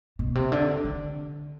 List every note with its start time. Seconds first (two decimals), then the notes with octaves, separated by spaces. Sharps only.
0.19 B2
0.35 C3
0.52 D3
0.84 D3